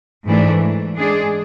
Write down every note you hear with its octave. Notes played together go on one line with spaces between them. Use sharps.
G#2 E3 A3 D4
G#3 D4 G#4 D5